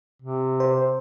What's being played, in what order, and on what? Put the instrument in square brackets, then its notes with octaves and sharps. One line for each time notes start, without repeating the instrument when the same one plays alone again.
[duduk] C3
[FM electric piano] C5